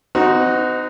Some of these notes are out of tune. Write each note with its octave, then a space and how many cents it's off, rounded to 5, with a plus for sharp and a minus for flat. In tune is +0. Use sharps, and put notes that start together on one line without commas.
C4 -40 D#4 +0 F#4 +0